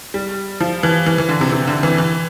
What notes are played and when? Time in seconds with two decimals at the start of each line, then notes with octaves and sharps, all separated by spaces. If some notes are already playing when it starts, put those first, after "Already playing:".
0.14 G3
0.60 F3
0.83 E3
1.06 E3
1.18 E3
1.29 D3
1.41 C3
1.53 C3
1.67 D3
1.83 E3
1.98 E3